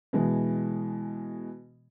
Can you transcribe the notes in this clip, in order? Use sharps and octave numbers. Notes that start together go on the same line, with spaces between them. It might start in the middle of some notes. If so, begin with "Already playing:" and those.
B2 E3 G#3